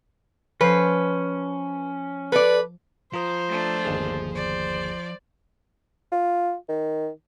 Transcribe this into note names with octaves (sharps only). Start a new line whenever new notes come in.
F3 C#4 B4 C5 C7
A4 B4 D5
F3 F4 C5 A#5 D#6
A3 D4
G1 D#2 G#4
C5 D5
F4
D#3